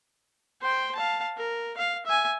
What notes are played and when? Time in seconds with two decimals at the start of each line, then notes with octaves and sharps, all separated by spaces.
0.62 C5 G5
0.95 F5 A5
1.37 A#4
1.77 F5
2.06 E5 G#5